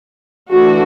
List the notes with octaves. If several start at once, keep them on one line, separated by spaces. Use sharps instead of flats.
E3 A3 D4 F#4